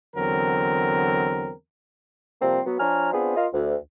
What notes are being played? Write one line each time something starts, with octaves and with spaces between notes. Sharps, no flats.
E2 D3 F#3 C4 A#4
C3 F3 G3 A#3 C4
F#3 B3
F3 D4 C#5 G#5 A#5 F6
B3 C4 D4 F4 G#4 C5
F4 A#4 D#5 F5
D2